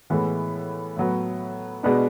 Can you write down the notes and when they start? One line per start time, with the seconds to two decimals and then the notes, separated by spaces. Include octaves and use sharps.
0.10 A2 E3 G#3 B3
0.96 A2 F#3 B3
1.83 B2 G#3 B3 D4